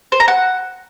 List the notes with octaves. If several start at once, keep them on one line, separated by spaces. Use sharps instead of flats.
C5
A#5
F#5